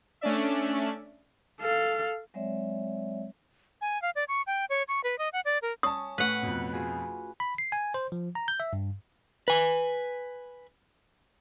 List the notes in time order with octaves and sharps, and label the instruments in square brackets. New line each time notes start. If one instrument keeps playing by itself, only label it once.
[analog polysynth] A3 C#4 D4 D5 E5
[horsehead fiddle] A4 F5
[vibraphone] F#3 G#3 C4 C#5 D5 E5
[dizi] G#5
F5
D5
C#6
G5
C#5
C#6
B4
D#5
F#5
D5
A#4
[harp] C#4 [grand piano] A5 C#6 [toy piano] D#6
[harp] A2 [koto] B4 F#5
[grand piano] F2 B2
[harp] F4 F#4 G#4
[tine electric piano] B5
C7
G#5
C5
F3
A#5
G6
E5
G2
[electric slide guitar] B4 G#5